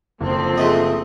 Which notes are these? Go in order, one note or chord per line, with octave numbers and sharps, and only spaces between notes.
F#1 D3 F3 C4
G#3 A3 D#5